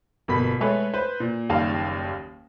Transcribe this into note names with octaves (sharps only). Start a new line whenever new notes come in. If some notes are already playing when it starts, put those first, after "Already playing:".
G1 B2 A#3 B3 B5 B6
G#3 A3 A4 B4 C#5
B4 C5
A#2
F#1 D#2 D#3 G3 F5 A5